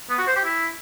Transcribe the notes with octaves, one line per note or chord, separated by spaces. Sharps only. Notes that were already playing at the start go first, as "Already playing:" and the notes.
B3
F#4
C5
G4
E4